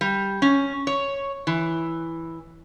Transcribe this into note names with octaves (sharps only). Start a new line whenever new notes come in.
G3
C#4
C#5
E3